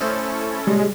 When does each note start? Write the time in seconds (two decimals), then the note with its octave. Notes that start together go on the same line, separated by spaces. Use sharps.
0.01 A3 C#4 E4 A4 C5 D#5
0.67 A#2 C#3 G3 G#3